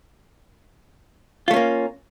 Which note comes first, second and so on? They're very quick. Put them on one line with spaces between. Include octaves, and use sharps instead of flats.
F4 A3 C#4 A#3